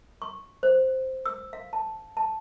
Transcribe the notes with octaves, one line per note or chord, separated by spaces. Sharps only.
C#6
C5
E6
F5
A5
A5